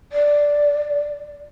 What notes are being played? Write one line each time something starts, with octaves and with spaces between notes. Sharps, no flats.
D5